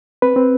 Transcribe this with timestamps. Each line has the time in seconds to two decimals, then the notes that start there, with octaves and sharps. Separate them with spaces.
0.22 C4 B4
0.36 C4